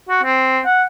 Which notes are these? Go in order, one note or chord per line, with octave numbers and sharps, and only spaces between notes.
F#4
C4
F#5